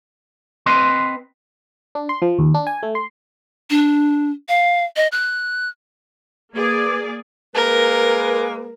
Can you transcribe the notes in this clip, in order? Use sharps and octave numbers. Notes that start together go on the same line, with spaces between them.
C4 B4 D#5 C6
D4
C6
F3
D#2
D4
G#5
A3
C6
D4
F5
D#5
F#6
A#3 G#4 B4 D5 D6 G#6
G#3 A#3 A#4 B4